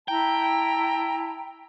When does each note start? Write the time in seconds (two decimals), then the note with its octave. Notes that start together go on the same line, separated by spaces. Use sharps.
0.08 E4 G5 A5 A#5